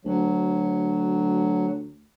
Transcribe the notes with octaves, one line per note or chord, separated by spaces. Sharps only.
D2 F#3